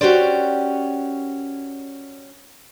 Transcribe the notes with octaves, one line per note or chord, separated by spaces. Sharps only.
C#4 F#4 G4 A#4 C5 D5